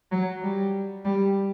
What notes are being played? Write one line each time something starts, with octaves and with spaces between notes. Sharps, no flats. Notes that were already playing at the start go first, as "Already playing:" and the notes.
F#3
G3
G3